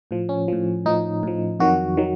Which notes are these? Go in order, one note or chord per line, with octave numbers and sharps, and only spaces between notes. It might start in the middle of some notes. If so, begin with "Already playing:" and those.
A2 F3
C#4
A2 F3
A2 F3 D#4
A2 F3
F2 D#3 F#3 F#4
D#3 F#3